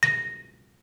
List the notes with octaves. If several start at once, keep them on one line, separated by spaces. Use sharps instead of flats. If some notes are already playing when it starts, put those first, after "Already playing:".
A#6